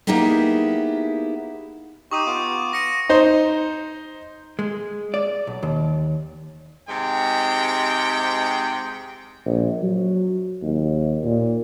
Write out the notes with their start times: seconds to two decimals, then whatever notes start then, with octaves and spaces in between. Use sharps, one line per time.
0.07 A#3 B3 D#4 E4 G4 G#4
2.11 D#4 G4 C#6 D#6 D#7
2.26 B3 F4 D6
2.73 A#6 C#7 D#7
3.09 D#4 C5
4.59 G#3
5.14 D5
5.47 B1
5.63 D#2
6.87 G#2 C3 G#3 G5
9.46 A#1
9.82 F#3
10.62 D#2
11.24 A#2